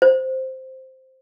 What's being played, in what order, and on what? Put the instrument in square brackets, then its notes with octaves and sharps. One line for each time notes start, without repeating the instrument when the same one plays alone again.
[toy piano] C5